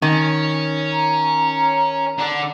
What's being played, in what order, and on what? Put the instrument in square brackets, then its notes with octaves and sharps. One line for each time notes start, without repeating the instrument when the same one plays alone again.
[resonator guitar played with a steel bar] D#3 [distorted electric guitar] C#4
[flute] A#5
[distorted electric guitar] D3 D4